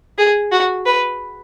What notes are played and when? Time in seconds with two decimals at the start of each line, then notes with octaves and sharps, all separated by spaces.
0.18 G#4
0.52 F#4
0.86 B4